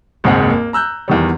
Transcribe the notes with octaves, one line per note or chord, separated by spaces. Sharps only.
F#1 D#2 G#2 C4 G#4 F#5
A#3
A#5 E6 F#6 G6
E2 D#3 G3